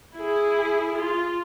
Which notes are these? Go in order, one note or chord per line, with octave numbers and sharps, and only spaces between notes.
E4 G#4
F4